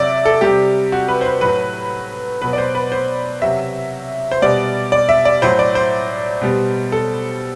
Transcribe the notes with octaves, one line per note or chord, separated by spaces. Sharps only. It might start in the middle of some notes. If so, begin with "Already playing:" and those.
Already playing: C3 F#3 D5 E5
A4
C3 G3 G4
F#4
B4
C5
B4
A2 F#3 B4
B2 F#3 B4
D5
C5
B4
C5
C3 F#3 E5
C5
B2 G3 D5
D5
E5
D5
A2 F#3 C5
D5
C5
B2 G3
A4